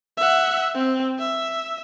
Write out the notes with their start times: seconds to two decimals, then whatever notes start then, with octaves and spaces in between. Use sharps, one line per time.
0.17 E5 F#5
0.75 C4
1.19 E5